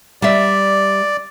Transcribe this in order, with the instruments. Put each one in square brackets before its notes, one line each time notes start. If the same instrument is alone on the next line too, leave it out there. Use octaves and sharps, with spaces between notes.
[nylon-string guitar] G3 E5 [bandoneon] D5